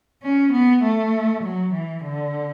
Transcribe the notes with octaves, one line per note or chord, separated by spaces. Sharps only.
C#4
B3
A3
F#3
E3
D3